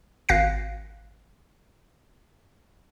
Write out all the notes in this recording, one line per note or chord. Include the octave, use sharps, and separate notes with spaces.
G#1 F5 F#6 A#6 C7